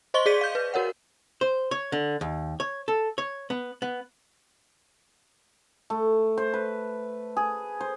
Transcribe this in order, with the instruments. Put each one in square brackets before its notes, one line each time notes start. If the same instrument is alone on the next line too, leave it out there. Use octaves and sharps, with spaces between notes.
[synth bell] C5 D#5 C6 C#6 G7
G#4 D5 B6 D#7
F5 G6
B4
F#4 A#4 C#5 F#5
[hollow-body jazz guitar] C5
C#5
D3
D#2
C#5
A4
C#5
B3
B3
[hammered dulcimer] A3
C5
B4
G#4
C5